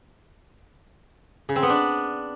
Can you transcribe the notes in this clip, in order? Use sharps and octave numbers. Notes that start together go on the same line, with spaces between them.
C#3
C4
B3
D4